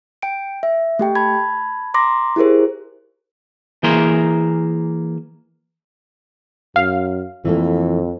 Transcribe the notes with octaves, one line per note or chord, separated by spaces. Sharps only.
G5 D7
E5
A3 G4 G5
A5 B5 G#6
A#5 C6 D6 A#6
E4 G4 G#4 A#4 C5
E3 A#3 G#4 A#4 C5
F#2 F5
F2 E3 A3 A#3